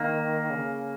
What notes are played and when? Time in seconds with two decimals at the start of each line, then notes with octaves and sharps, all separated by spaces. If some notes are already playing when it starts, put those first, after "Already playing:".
Already playing: D#3 A#3
0.50 C#3